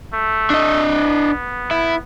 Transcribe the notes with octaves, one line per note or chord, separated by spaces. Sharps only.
A3
D4 D#5
B3
E4